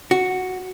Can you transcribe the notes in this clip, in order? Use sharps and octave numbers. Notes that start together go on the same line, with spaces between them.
F#4